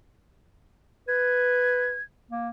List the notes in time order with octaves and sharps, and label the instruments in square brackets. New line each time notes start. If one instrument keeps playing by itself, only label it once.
[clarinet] B4 [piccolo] G#6
[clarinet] A#3